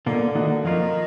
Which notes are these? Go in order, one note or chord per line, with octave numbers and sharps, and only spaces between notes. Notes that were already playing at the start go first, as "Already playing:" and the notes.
B2 D3 A#3 F4
D#3 A#3 D#4 F#4
F2 D#3 F3 A#3 F4